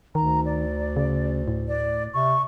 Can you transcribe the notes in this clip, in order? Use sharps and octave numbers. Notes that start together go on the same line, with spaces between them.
D2 D#3 A#5
D5
C#3
A2
D5
C3 C#6